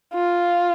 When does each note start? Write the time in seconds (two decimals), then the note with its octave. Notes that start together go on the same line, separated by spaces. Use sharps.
0.14 F4